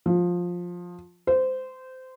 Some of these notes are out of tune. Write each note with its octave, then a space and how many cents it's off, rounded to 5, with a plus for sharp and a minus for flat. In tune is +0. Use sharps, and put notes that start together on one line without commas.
F3 +15
C5 -20